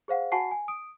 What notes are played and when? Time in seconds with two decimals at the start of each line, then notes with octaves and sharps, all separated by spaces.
0.08 G#4 C5 F5 F#5
0.32 F#4 F#5 G#5 A5 C#6 C7
0.51 G#5
0.68 D#6 D7